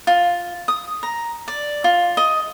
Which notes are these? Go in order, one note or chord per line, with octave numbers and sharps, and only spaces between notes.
F4
D#6
A#5
D5
F4
D#5